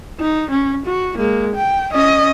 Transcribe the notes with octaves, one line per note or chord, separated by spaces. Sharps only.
D#4
C#4
F#4
G#3 A#3
G5
C#4 D#5